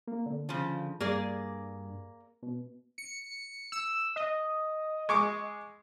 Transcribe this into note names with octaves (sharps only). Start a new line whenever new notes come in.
A#3
D3
C#3 F3
G2 A#3 G#4 D5
B2
C#7
E6
D#5
G#3 C#6 D6